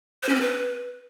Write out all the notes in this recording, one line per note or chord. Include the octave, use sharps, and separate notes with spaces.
C5
C#4
C4
B4